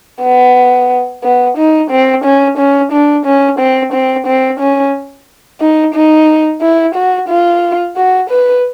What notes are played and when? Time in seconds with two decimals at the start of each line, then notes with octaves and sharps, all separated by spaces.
0.22 B3
1.24 B3
1.57 D#4
1.91 C4
2.24 C#4
2.58 C#4
2.92 D4
3.26 C#4
3.59 C4
3.93 C4
4.27 C4
4.60 C#4
5.61 D#4
5.94 D#4
6.62 E4
6.95 F#4
7.29 F4
7.96 F#4
8.30 B4